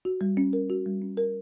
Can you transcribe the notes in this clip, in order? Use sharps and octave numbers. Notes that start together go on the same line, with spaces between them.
F#4
G3
C#4
A#4
F#4
G3
C#4
A#4